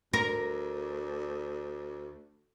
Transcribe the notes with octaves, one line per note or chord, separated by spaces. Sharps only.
D2 A#4